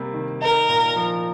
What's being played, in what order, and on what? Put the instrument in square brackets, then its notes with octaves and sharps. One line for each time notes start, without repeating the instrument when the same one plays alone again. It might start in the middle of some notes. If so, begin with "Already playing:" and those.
Already playing: [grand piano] C3 G3 A#3
D#3
[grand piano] D#4 [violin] A#4
[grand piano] A#2
F3